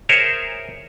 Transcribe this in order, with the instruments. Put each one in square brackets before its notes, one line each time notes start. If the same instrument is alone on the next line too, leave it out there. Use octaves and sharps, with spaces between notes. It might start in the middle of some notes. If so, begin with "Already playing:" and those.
[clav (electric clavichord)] G#4 A#4 C5 C#5 E5